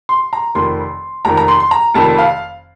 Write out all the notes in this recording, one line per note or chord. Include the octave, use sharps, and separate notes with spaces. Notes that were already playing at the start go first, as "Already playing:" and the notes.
C6
A#5
F1 F2 D#3 C6
F1 F2 D#3 A#5
A#5
C6
C6
A#5
F1 F2 D#3 A5
F5